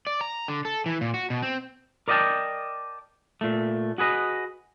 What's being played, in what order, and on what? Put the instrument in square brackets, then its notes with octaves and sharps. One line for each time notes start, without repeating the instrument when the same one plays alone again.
[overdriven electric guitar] D5
A#5
D3
A4
E3
A#2
F#4
B2
C4
[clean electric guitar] A#4 D5 D#5 F5 G5 A5
A#2 A3
F#4 G#4 B4 D#5